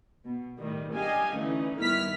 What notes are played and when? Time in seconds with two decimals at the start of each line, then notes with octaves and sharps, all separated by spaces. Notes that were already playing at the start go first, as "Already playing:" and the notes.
0.25 B2
0.58 A2 D#3 G3
0.93 D4 G4 D#5 F5 G#5
1.35 D3 E3 A3 C#4 D#4
1.80 G2 D#3 B3 E4 F6 B6